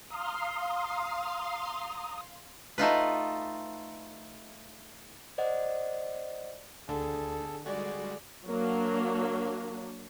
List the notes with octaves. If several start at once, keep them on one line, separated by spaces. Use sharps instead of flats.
F5 A#5 C6 D#6
A3 D#4 F4 B4
C5 D5 D#5 F#5
D2 D3 G#4 A4
G3 G#3 F#4 G#4 D5
F#3 A#3 D4